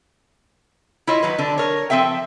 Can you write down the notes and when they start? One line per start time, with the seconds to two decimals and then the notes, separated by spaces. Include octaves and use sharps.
1.07 E4 F4 C#5 D#5
1.22 D#3 F#3 B4
1.39 D3 D4
1.58 A#4 C#5
1.90 F3 C4 A4 E5 G5